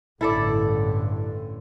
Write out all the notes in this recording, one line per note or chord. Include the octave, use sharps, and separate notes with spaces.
A1 G2 D3 E4 A4 D5